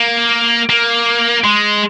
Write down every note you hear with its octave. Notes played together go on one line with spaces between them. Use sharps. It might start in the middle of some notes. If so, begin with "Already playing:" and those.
Already playing: A#3
A#3
G#3